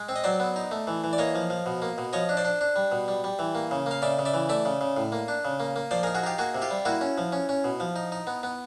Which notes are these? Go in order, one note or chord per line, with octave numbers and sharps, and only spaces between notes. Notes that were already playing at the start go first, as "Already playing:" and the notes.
Already playing: G#3
C4
D#5
F#3 C5 D5
B3
D#4
A3
E3
E3
D5
A#3 C#5 D#5
F3
F3
B2
A#3
B2
F3 C#5 D#5
D4
C5 D5
D4
D4
G3
B2
G3
G3
E3
A#3
C#3
A#3 F5
C#3 D5 E5
C#3
D5 E5
E3
A3 D5 E5
C#3
C#3
A2
A#3
D4
C#3
A#3
A#3
F3 C5 D5
D#4 G#4 A#4
F#4 G#4
D#4 F4 G4
A#3 F#4 G#4
C3
F4 G4
G3
A#3 E4 F#4
C#4
F3
C#4
C#4
B2
F3
D#4
D#4
B3
B3